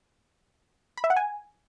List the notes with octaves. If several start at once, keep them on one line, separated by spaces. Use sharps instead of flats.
B5
E5
F#5
G#5